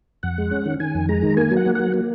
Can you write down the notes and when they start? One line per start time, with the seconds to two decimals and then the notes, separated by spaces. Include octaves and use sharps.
0.23 F2 F#5
0.38 G#3
0.51 C#4
0.65 D#3
0.80 D#3 G#5
0.95 F2
1.09 G#3 A#5
1.22 D#3
1.37 A#3 G#5
1.51 F#3
1.57 F#5
1.66 A#3
1.75 F#3 F#5
1.94 A#3